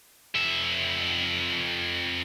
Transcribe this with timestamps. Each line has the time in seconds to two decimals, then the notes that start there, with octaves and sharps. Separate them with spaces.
0.35 F2 E5